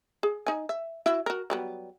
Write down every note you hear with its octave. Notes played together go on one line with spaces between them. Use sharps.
G#4
D#4 G#5
E5
E4 F#4 E5
F#4 A#4
F#3 G3 B3